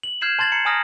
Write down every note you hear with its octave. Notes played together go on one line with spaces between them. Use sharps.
F#7
F6 G6 G#6 C7 E7 F#7
A5 C6 G#6 A6 F#7
A#5 C7 C#7
G#5 A#5 D#6 F6 A#6